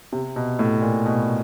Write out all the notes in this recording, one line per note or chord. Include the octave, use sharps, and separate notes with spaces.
C3
B2
A2
A#2
B2